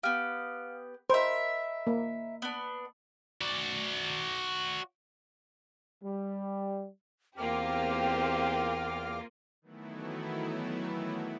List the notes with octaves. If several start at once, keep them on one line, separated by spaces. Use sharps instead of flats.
B3 G4 F5 F6
A#4 C5 D#5 E5 B5
A#3
B3 D4
F#4 D5
G3
E2 A#3 C4 F4 G4 G5 D6 F6
D#3 E3 F#3 A3 B3 E4